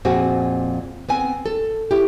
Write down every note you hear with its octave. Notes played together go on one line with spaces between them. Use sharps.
F2 A#2 C4 F#4 G#4
B3 C4 G#5
A4
E4 G4